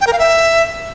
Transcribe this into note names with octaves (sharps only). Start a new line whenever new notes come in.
G5
A#4
F5
E5